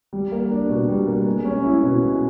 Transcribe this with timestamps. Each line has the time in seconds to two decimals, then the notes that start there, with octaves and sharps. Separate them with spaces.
0.13 G3
0.32 A#3
0.51 D4
0.69 B2
0.88 G3
1.07 A#3
1.26 G#3
1.45 C#4
1.64 E4
1.83 B2
2.02 G#3